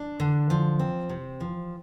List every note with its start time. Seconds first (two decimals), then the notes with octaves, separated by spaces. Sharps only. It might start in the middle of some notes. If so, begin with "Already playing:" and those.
Already playing: D4
0.20 D3
0.50 F3
0.79 C4
1.10 C3
1.41 F3